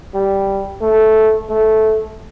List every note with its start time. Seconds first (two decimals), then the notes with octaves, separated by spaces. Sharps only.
0.14 G3
0.82 A3
1.49 A3